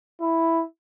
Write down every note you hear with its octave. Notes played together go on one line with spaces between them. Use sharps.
E4